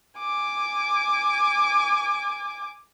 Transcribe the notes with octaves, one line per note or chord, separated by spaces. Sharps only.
G#5 D6